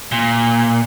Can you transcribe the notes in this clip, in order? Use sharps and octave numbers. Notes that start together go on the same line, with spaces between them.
A#2